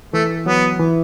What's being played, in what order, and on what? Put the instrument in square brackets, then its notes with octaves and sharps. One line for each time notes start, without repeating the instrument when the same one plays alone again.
[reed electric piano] E3 [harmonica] A3
[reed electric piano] F#3 [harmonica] B3
[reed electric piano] E3